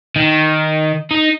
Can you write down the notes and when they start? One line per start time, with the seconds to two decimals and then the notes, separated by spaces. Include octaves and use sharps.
0.16 D#3
1.11 D#4